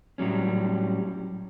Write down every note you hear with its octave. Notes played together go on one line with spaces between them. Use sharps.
A2 F#3 G3 C#4